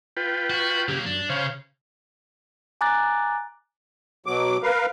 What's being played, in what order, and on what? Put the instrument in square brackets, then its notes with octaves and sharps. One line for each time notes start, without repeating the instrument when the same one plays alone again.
[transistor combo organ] F4 B4 G5
[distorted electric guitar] F#4
[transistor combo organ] C#3 G4 [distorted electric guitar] F#3 A#3
[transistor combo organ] F#2 [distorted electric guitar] D4
[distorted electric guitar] C#3 [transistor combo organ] C5 C#5 F5
[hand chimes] G#5 A#5 D6 F#6 A6
[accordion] B2 F#3 D6
A#4 B4 F5